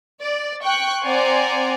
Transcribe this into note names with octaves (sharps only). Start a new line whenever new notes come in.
D5
G5 C#6 F#6
C4 D5 F#5 G#5 A#5 C6